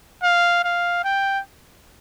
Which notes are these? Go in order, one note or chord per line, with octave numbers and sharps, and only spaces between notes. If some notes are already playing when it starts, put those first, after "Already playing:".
F5
F5
G5